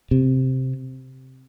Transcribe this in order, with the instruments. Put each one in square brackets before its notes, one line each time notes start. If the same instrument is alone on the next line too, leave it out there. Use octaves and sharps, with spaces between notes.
[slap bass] C3